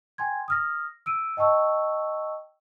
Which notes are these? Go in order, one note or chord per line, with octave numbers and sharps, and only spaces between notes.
G5 G#5 C6 G#6
D#6 F6 A#6
E6 D7 D#7
D#5 G5 A5 C#6 E6